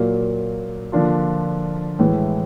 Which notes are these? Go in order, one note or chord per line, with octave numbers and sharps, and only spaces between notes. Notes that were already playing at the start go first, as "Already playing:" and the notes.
Already playing: A#2 F#3 A#3
D3 F3 A#3 D4 F4
A2 E3 G#3